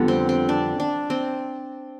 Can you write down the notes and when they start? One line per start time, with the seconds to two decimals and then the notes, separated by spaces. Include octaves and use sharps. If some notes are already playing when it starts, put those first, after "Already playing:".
Already playing: F2 D3 G3 B3
0.08 C4
0.29 C4
0.49 D4
0.80 D4
1.10 C4